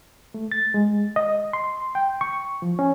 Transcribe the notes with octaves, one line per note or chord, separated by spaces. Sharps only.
A3
A6
G#3
D#5
C6
G5
C#6
F3
C#4